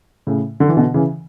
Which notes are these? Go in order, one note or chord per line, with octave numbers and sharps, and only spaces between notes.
A2 C#3
D3
E3
B2 D3
C#3 E3